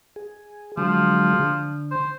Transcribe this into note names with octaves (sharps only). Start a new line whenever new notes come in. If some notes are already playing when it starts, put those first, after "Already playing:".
G#4
D3 F3 F#3 G#3
D3
C5